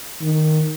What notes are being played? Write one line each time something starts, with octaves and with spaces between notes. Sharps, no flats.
D#3